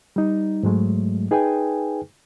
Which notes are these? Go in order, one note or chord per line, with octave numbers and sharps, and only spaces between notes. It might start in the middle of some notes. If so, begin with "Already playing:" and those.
G3 D#4
G#2 F#3 G#3 A3
D#4 G#4 B4 G5 G#5